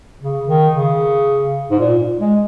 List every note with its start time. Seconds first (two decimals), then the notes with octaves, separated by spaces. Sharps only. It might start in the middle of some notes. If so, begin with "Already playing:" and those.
0.21 C#3
0.49 D#3
0.74 C#3
1.71 G#2
1.79 A#2
2.20 G#3